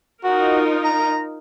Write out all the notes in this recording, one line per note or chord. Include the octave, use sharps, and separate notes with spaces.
D#4 F4 F#4 A#4
A#5